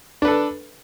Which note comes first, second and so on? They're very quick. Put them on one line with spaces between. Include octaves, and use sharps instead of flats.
D4 B4 A4